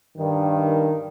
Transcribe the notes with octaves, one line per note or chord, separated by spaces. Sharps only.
G2 D#3